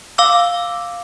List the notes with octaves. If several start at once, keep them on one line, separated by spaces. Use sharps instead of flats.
F5 D6 E6